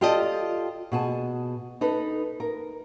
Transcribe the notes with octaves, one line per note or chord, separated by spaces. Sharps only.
F4 G4 A4 D5 D#5
B2 G#4 A5
D#4 A4 B4
A#4